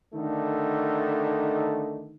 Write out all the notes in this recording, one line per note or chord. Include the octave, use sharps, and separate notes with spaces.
D3 D#3 A3 D#4